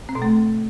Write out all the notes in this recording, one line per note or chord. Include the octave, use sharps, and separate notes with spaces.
C4
B2
A3